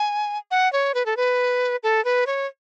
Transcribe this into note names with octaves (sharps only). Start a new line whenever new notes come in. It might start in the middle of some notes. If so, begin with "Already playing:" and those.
Already playing: G#5
F#5
C#5
B4
A4
B4
A4
B4
C#5